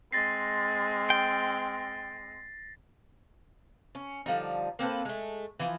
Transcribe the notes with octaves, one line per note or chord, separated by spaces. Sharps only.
G#3 C4 A6 A#6 C7
G5
C#4
D3 F3 G3 D#4
A#3 C4 A4 B4
G#3 A3
E3 F3